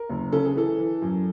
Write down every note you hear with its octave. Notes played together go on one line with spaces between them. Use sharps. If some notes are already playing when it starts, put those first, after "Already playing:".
Already playing: A#4
F#1
C#3 A4
G#4
E3 A4
E3
F#2